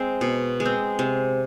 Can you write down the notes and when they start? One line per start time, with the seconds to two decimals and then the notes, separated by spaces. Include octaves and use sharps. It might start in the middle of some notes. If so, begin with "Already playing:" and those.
Already playing: G#3 C4
0.21 B2
0.60 G#3
0.65 C4
0.99 C3